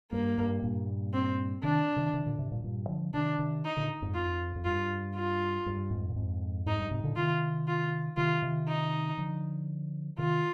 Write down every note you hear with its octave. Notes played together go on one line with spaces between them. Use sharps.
G2 A#3
G2
G2 A#2
C4
C3 D#3 D4
C3 D#3
C3 D#3
A#2 D3
G#2 C3
G2 A#2
G2 A#2
D3 F3
C3 D#3 D4
C3 D#3
D#4
A#2 D3
F2 G#2
F2 F4
F2
G2 F4
F4
G2
F2 G#2
A#2
F2 G#2
F2 G#2 D#4
G2
G#2 C3
A#2 D3
C3 D#3 F4
F4
C3 D#3 F4
C3 D#3
D#4
D3 F3
C3 D#3 F4